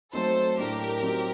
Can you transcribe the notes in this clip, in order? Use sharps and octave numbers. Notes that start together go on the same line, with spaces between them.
F#3 A3 C4 D#4 A4 C5
A2 A3 D4 G4 A#4
F#3 C4 D#4